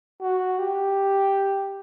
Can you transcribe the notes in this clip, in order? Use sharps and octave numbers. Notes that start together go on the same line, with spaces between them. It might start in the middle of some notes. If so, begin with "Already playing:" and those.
F#4
G4